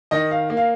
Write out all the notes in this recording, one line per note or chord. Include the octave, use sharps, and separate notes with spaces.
D#3 D#5
F5
A#3
F5